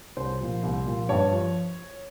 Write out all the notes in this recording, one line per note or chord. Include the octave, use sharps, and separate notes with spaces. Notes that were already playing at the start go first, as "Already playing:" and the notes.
C2 C5
A#2 F3
C2
A#2 F3
G2 C#5
F3